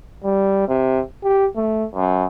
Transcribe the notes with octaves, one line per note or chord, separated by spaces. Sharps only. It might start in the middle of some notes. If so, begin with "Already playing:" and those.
G3
C3
G4
A3
F#2